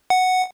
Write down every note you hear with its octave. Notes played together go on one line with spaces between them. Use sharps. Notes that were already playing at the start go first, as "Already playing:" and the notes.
F#5